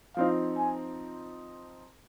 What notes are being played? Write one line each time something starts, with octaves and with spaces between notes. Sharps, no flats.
F3 C4 D#4 F5
G#5